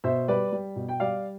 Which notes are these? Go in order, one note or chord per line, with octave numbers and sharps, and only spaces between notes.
B2 C5 E5
G3 B4 D5
G3
B2
G5
G3 D5 F5